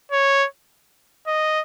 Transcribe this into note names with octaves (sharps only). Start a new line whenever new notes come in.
C#5
D#5